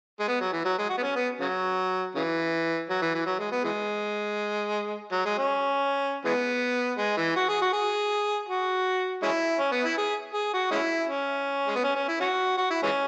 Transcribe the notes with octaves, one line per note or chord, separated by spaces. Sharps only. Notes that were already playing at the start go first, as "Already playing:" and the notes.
G#3
B3
F#3
E3
F#3
G#3
F#4
B3
C#4
B3
C#3 F#3
C#3 E3
F#3
E3
E3
F#3
G#3
B3
E3 G#3
F#3
G#3
C#4
E3 G#3 B3
G#3
E3
F#4
G#4
F#4
G#4
F#4
G#3 C#4 E4
C#4
B3
E4
G#4
G#4
F#4
G#3 C#4 E4
C#4
G#3
B3
C#4
C#4
E4
C#4 F#4
F#4
E4
E3 G#3 C#4